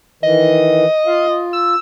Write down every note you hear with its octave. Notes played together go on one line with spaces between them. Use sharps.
D#3 E3 D#5
F4 F5
F4
E6